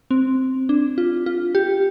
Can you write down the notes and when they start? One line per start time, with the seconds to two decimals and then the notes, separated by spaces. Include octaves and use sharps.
0.11 C4
0.69 D4
0.98 F4
1.26 F4
1.55 G4